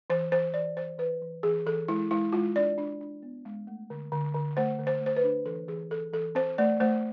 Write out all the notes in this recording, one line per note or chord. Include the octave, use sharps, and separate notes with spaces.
E3 C5
E3 C5
E3 D5
E3 C5
E3 B4
E3
E3 G#4
E3 A4
G#3 E4
G#3 E4
G#3 F4
D4 D5
D4
D4
B3
G#3
A3
D3
D3
D3
A3 C5
D3
C5
A3
C5
B4
D4
E3 A4
E3 G#4
E3 A4
E3 A4
C4 C5
A3 D5
A3 C5